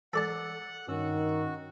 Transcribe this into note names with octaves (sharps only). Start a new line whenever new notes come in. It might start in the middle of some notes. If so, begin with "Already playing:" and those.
A4 D5 F#5 A5
G2 D#3 C#4 F#4 E6